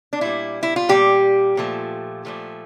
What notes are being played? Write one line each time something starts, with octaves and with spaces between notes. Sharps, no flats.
D4
A#2 G3 E4
E4
F4
A#2 G3 G4
A#2 F3 A3
A#2 F3 A3